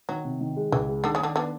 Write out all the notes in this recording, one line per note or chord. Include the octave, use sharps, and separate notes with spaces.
D#3 F#3
C3
D#3
G#3
C#2 E3
G#3
D3 D#3
C#3
D3 D#3
D3 B3